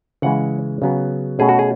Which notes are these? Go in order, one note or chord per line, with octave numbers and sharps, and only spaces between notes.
C#3 E3 G#3 F#5
C#3 F#3 B3
B2 A3 C#4 G#4
F#4
G#4